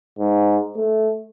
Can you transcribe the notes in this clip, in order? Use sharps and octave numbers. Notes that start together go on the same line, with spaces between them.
G#2
A3